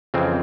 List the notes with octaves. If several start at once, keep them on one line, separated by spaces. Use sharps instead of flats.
F2 C#3 E3 C4